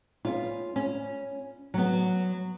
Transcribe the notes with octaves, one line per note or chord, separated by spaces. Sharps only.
B3 C#4 F4
C#4
F#3 B3